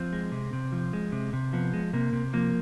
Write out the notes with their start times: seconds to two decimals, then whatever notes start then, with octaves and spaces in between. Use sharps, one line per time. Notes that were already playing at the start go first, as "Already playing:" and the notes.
Already playing: F3 C4
0.13 G#3
0.32 C3
0.53 C3
0.72 F3
0.93 G#3
1.12 C3
1.33 C3
1.53 F3 B3
1.73 G#3
1.93 C3 A#3
2.13 C3
2.33 F3 A#3